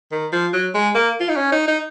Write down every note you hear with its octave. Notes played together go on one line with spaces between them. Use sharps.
D#3
F3
F#3
G#3
A#3
F4
D#4
C#4
D#4
D#4